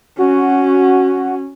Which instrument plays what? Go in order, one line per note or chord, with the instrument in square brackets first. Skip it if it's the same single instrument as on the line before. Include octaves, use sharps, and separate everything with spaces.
[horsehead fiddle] C#4 [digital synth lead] F#4